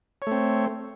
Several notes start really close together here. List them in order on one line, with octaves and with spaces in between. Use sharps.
C#5 A3 C4